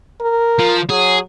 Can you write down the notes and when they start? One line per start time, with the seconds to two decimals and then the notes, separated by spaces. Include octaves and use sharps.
0.21 A#4
0.60 F3
0.90 F#3 G#4